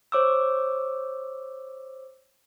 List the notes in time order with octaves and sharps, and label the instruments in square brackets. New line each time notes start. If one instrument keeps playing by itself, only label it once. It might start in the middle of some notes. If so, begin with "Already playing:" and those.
[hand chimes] C5 C#5 D6 E6